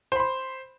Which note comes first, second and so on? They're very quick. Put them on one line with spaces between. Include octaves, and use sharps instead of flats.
C5 B5 C6